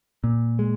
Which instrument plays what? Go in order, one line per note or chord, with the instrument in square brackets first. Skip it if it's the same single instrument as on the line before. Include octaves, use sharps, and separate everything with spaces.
[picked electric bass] A#2
G#3